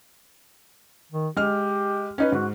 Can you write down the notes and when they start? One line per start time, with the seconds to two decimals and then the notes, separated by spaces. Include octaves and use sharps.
1.12 D#3
1.37 G#3 G4 F6
2.18 C#4 D#4 B4
2.32 G#2 F#4